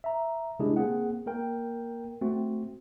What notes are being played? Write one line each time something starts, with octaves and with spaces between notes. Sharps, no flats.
E5 A#5
C#3 G#3 D4 E4 G4 G#4
A#3 C4 G#4 F#5
A#3 A#4 G5
A3 C4 F#4